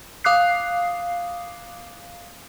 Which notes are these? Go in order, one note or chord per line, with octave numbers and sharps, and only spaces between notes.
F5 D6 D#6 F#6 C7